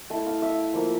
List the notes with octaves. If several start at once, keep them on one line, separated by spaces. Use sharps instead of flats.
A3 E4 A5
F5
E5
F3 A#3 F4